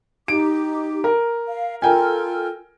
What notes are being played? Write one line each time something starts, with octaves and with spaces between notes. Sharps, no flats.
D#4 G4 D6 D7
A#4
F5
F4 A4 A#4 G5 G#5 F6